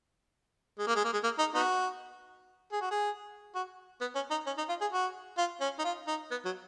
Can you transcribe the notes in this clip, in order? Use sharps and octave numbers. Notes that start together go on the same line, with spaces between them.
G#3
A#3
G#3
A#3
G#3
A#3
D#4
B3 D#4 F#4
G#4
F#4
G#4
F#4
B3
C#4
D#4
C#4
D#4
F4
G#4
F#4
F4
C#4
D#4
F4
D#4
B3
F#3